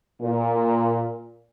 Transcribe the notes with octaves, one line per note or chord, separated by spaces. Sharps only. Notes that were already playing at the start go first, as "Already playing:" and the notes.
A#2